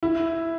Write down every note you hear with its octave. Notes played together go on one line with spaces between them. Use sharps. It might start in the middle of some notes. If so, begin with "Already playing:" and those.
E4